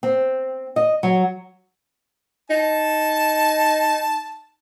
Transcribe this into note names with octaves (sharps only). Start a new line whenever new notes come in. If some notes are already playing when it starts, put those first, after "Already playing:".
C4
D#5
F#3
D#4 A5